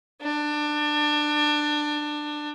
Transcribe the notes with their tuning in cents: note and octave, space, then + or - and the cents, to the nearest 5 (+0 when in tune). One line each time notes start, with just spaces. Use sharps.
D4 +20